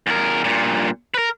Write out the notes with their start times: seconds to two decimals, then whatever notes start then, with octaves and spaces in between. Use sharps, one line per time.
0.07 E2 A#4
0.44 G2 A#2
1.14 A#4 B4